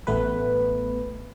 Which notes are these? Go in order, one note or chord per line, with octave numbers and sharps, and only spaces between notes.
A1 A3 B3 B4